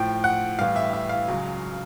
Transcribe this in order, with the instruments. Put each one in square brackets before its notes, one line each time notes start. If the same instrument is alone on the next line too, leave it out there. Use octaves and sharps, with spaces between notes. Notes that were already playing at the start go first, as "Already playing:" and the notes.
Already playing: [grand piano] A2 F3 G5
F#5
A2 E3 G3 F5
E5
E5
F5
C#2 C#3 F#3